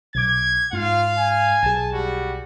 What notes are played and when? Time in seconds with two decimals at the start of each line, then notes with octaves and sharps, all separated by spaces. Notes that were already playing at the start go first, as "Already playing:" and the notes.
0.15 B1 D6 G#6
0.73 G#2 F4 F5
1.18 G#5
1.63 B1 G#4 A5
1.93 G3 F#4